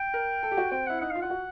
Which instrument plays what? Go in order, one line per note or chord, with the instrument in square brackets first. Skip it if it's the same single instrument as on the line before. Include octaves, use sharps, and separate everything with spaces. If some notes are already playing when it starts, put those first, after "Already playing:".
Already playing: [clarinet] G5
[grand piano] A#4
A4
G4
F#4
[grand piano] C4 [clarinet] G5
[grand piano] E4 [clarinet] F#5
[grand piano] D#4 [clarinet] F#5
[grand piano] F4 [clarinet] F5
[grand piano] F4 [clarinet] F#5
[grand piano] F#4